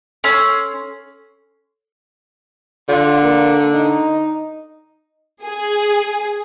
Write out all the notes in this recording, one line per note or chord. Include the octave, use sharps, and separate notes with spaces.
C#4 A4 C#5 C6 E6 C7
D3 F4
A#3
D#4
G#4